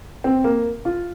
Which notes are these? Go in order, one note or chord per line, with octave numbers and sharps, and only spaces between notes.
C4
A#3
F4